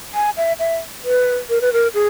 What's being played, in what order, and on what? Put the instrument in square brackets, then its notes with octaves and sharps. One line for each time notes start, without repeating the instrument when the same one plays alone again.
[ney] G#5
E5
E5
B4
A#4
B4
A#4
G#4